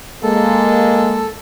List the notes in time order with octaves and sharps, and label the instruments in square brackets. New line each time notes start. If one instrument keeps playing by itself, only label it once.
[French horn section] G#3 A#3 [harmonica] A4